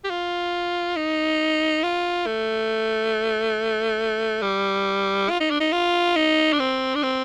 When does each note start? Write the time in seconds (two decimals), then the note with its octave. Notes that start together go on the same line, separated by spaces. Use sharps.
0.04 G4
0.10 F4
0.96 D#4
1.83 F4
2.26 A3
4.42 G3
5.30 F4
5.40 D#4
5.50 D4
5.60 D#4
5.72 F4
6.16 D#4
6.53 D4
6.60 C4
6.95 D4
7.03 C4